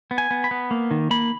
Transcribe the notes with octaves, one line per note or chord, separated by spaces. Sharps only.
B3
G#5
B3
B5
B3
A#3
D#3
A#3 B5